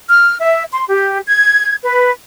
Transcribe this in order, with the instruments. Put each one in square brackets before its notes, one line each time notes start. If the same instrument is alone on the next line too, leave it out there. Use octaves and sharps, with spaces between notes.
[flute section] F6
E5
C6
G4
G#6
B4